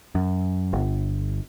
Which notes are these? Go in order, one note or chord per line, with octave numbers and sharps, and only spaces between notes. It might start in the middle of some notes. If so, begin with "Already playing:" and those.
F#2
G1